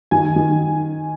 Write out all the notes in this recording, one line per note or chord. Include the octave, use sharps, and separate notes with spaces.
D#3 G#5
D#3